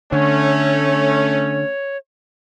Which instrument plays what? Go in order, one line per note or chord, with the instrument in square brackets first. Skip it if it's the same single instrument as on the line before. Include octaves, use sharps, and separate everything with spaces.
[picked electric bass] D3 [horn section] A3 C#4 [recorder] C#5